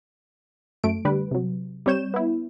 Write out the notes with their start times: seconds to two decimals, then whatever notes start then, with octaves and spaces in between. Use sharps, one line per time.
0.84 F#2 A3 D7
1.05 D3 G3 B4
1.31 C3 F#3
1.86 G3 C4 C#5 G6 E7
2.14 B3 E4